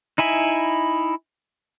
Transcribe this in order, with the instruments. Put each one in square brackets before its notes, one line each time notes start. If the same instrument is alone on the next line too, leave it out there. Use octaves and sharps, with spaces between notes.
[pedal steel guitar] D#4 E4 G#5 B5